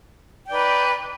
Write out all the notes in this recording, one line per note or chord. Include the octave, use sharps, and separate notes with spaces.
D#4 B4 D5 G5